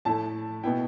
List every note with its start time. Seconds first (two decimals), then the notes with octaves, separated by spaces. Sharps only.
0.05 A2 A3 E4 A5
0.63 B2 B3 E4 G5